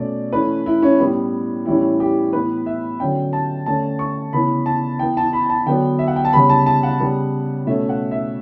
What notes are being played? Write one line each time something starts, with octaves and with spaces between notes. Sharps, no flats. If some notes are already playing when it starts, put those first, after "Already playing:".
Already playing: B2 A3 C#4 D5
E3 A3 C#4 B4
E4
C#4
A2 G3 B3
A2 E3 G3 C#4 E4
G4
A2 E3 B3 B4
E5
D3 F#3 C#4 G5
A5
D3 A3 C#4 A5
C#6
C#3 E3 B3 B5
A5
E3 B3 G5
A5
B5
A5
D3 F#3 B3 G5
E5
F#5
G5
A5
C#3 G3 B3 B5
A5
A5
F#5
C#3 G3 B3
B2 A3 C#4 E5
F#5
E5